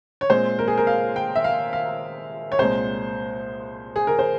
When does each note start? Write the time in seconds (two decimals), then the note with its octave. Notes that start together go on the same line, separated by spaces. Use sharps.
0.21 C#5
0.30 A#2 G#3 C4 C5
0.59 A#4
0.68 G#4
0.78 A#4
0.87 F5
1.16 G5
1.35 E5
1.44 F5
1.73 F5
2.52 C#5
2.59 C2 A#2 G#3 C5
3.96 G#4
4.07 A#4
4.19 C5